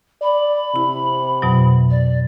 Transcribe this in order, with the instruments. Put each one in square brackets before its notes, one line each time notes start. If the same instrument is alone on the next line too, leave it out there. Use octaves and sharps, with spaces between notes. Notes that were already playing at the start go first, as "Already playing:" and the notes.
[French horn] D5 [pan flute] B5
[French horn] C3 [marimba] E4
[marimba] F2 B2 F#3
[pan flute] D5